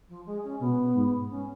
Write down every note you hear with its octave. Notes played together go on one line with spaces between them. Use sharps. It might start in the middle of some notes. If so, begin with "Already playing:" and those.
F3
G#3
C#4
B2 B3
G#2
C#4